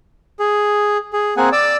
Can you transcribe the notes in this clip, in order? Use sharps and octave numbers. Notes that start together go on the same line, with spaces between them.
G#4
G#4
A#3 C4 G#4 F#5 G#5
D5 D6 E6